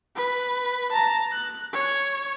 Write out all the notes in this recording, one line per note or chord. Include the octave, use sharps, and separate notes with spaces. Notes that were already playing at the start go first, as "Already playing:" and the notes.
B4
A5 A#5
F#6
C#5